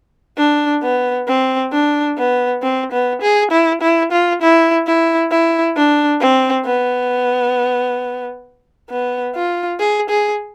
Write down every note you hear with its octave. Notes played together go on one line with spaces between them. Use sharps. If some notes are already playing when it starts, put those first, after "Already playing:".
D4
B3
C4
D4
B3
C4
B3
G#4
E4
E4
F4
E4
E4
E4
D4
C4
B3
B3
F4
G#4
G#4